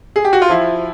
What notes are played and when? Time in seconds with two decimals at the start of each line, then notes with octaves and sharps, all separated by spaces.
0.16 G#4
0.25 G4
0.33 F#4
0.42 F4
0.49 F3 E4